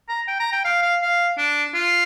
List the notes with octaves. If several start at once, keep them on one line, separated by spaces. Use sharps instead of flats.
A#5
G5
A#5
G5
F5
F5
F5
D4
F4